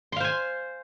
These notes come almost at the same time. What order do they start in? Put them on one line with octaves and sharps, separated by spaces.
C6 F5 C5 G#5